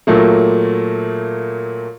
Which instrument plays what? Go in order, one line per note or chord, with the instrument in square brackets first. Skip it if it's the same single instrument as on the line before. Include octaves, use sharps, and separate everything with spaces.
[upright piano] A#2 F#3 A3 A#3